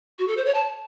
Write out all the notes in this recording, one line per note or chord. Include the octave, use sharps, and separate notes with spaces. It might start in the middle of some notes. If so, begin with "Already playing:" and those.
F#4
A4
C5
C#5
A5